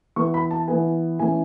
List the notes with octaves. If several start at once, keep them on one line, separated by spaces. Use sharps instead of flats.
E3 B3 C#6
B5
A5
E3 B3 G#5
E3 A3 C#4 G#5